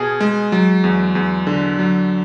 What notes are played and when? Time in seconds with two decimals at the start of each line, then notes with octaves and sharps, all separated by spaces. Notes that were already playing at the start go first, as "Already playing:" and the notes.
Already playing: B2 G#4
0.21 G#3
0.52 F#3
0.84 E2
1.15 E2
1.47 D3
1.79 F#3